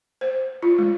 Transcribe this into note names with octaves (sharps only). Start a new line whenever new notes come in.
C5
F4
G#3